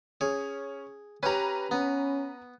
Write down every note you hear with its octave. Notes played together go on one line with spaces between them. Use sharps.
C#4 G#4
C#4 G4 B4 A#5
B3 C#4